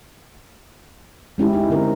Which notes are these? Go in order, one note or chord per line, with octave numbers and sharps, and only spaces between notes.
G#3 C#4 E4 G4
D#4 E4
D3 C4 A#4